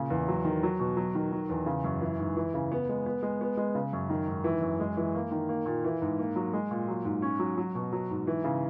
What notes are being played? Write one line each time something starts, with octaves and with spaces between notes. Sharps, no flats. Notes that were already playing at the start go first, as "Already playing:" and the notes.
Already playing: A#2 C#3
E2
F#3
D#3
F#3
B2
F#3
D#3
D#3
E2
C#3
F#2
E3
G#2
E3
C#3
B3
G#3
B3
G#3
B3
G#3
C#3
F#2
D#3
G#2
E3
F#2
G#3
E3
A#3
D#3
A#3
A#2
E3
G#2
A#3
F#3
G#3
A#2
F#3
G#2
C#4
F#3
F#3
B2
F#3
G#2
E3
C#3